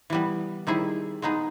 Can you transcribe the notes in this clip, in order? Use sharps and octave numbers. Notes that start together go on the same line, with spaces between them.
E3 G3 B3
D#3 G3 C4 E4 G#4
G#3 B3 D#4 G#4